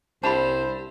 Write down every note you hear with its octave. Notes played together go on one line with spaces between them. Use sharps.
C2 D4 E4 G4 C5 A5 B5